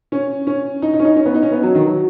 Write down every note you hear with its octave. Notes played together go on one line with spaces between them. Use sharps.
C#4
C#4
D#4
D#4
C#4
D#4
C#4
B3
D#4
C#4
B3
F#3
D#3
F#3